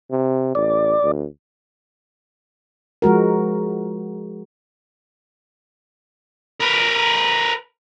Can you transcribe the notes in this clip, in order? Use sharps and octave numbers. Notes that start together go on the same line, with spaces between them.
C3
A1 D5
D2
F3 G#3 F#4 A#4
A#4 B4